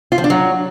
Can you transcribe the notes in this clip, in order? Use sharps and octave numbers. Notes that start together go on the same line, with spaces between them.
F4
F3
D4
F#3